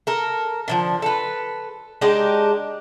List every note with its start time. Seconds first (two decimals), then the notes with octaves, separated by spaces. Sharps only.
0.07 A4 A#4
0.68 D3 D#3 F3
1.02 A4 B4
2.01 G#3 D4 D#4 G4